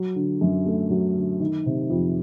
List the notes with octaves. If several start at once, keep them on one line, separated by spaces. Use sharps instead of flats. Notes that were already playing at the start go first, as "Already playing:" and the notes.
Already playing: F#3
D3
F#2
A3
F#3
D3
D#3
C3
F2